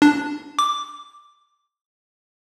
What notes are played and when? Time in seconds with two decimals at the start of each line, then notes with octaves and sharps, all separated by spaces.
0.02 D4
0.59 D6